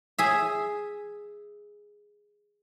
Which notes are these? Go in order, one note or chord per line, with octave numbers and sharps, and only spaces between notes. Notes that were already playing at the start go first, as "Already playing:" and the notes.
G#4 E5